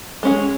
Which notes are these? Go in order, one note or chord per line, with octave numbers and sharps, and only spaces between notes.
G#3 C#4 G#4